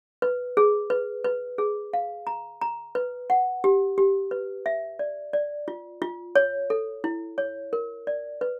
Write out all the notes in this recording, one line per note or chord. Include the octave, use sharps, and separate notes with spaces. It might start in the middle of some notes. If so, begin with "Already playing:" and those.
B4
G#4
B4
B4
G#4
F5
A#5
A#5
B4
F#5
G4
G4
B4
E5
D5
D5
F4
F4
C#5
A4
E4
C#5
A#4
D5
B4